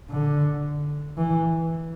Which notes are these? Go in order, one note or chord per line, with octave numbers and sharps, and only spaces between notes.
D3
E3